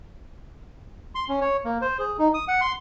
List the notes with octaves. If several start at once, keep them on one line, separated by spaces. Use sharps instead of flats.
C6
C#4
C#5
A#3
C5
G#4
D#4
D#6
F#5
C6